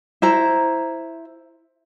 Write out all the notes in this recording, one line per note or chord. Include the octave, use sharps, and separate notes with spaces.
E4 C5 A#5